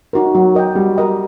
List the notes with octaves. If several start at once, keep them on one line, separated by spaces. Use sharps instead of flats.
D#4 F#4 A#4
F#3 F#4
A#4 D#5 G5
G3 F#4
A#4 D#5 G5